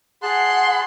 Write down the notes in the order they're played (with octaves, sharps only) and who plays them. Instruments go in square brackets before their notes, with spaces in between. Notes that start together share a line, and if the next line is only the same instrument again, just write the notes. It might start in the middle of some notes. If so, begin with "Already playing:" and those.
[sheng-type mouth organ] G#4 A5 F#6 [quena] F#5 [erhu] C6